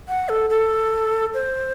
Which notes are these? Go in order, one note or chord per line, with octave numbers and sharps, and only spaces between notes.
F#5
A4
A4
C5